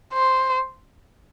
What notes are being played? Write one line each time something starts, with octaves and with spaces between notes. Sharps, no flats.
C5